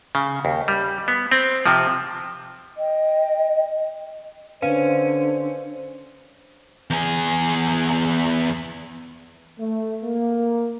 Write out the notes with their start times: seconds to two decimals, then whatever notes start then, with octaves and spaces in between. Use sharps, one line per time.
0.15 C#3
0.45 D#2
0.68 G3
1.08 B3
1.31 C4
1.66 C3 F3
2.77 D#5 G5
4.62 D3 C#4 B4 C5 F5 D#7
6.90 E2 G#4
9.60 A3
10.04 A#3